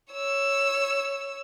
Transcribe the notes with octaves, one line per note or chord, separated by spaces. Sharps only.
C#5 E6